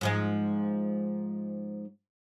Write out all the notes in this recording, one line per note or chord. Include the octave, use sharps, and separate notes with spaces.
G#2 F3 G#3